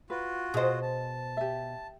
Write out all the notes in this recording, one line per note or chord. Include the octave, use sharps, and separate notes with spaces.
F4 F#4 B4
B2 G#4 C5 D#5
A5
G4 E5